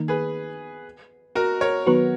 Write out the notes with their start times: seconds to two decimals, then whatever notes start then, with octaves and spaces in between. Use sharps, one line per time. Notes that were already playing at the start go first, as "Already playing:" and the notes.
Already playing: D#3 A#3 D#4
0.08 G#4 B4
1.35 F#4 A#4
1.61 A#4 C#5
1.87 D#3 F#3 B3 F#4 B4